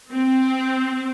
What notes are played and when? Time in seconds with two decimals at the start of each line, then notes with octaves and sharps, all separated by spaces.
0.13 C4